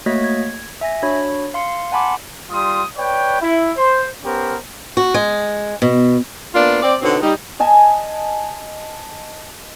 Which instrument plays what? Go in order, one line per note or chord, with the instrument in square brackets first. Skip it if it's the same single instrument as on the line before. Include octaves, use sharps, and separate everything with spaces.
[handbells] A3 A#3 F#4 C#5 D#5 B6
G#6
E5 G#5 A#6
D4 F#4 C#5 B5
F5 C6 C#7
F#5 G#5 A5 B5 C6 D6
[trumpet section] G3 F4 C6 D#6
B4 C#5 D5 G5
E4
C5
B3 C#4 G4 A#4 C5
[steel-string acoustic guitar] F#4
G#3
B2
[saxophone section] A#3 B3 D4 F4
C4 D5
B2 D3 B3 C4 D#4 C#5
G3 D#4
[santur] D#5 G#5 A5